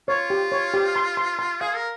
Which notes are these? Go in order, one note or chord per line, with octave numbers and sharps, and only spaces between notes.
F4 C#5
G4
C#5
G4
C6
C6
C6
G#4 F5
A#4